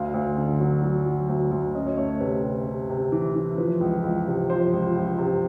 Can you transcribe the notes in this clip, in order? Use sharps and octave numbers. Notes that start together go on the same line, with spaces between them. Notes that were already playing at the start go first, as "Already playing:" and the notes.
Already playing: D2 F5
D2
D3
F#3
F#3
F#3
D2
D2
C#4 D#5
C#5
A3 C#5
C#5
C3 B4
C3
C3
C3
E3
E3
F3 B4
C#2
C#2
C3
F3 C5
C#2
C#2
C3